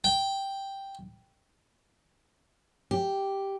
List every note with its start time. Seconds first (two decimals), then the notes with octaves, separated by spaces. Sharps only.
0.04 G5
2.91 G4